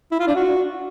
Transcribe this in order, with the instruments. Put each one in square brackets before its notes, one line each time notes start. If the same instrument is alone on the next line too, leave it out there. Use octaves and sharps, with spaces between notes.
[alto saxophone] E4
F4
D4
F#4